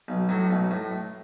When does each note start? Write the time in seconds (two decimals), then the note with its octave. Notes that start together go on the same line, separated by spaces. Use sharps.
0.08 B1
0.29 A2 F#3
0.51 B1
0.71 A2